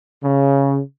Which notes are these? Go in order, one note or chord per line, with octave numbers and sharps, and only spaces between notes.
C#3